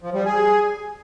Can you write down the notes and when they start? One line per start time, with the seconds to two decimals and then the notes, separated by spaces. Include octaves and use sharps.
0.02 F3
0.14 G3
0.26 G#4